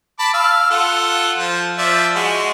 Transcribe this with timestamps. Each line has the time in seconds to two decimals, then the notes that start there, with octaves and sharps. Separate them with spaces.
0.19 A5 B5 D6
0.33 F5 E6
0.71 F4 A4 F#5
1.38 F3
1.78 F3 D5 E5
2.16 G#3 F#4